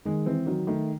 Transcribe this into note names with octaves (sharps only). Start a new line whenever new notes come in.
D#3 G#3
E3 C4
D#3 F#3
D#3 A3